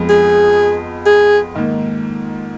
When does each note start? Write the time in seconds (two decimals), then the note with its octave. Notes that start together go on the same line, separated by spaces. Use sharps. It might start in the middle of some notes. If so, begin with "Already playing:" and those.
Already playing: F2 F3 G#3 B3 F4
0.09 G#4
1.06 G#4
1.55 G#2 D#3 A#3